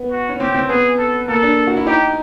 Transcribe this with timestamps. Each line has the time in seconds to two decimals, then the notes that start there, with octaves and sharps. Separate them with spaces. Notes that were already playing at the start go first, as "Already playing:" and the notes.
Already playing: B3
0.11 F#4
0.29 C#4
0.40 C4 G4
0.54 C4
0.69 B3 G#4
0.98 A4
1.28 A#3 A4
1.43 D4
1.67 F#4
1.77 E4
1.87 D#4 G4